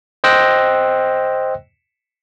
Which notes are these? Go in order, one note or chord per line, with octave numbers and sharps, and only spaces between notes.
C5 D#5 G5 E6 F#6 A#6